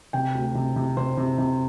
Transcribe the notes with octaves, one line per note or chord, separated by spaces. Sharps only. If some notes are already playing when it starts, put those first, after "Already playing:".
C3 G5
D2
C3
C3
C3 C5
C3
C3